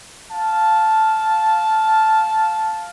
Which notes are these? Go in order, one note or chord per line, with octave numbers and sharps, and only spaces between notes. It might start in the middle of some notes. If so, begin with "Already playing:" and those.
F5 A5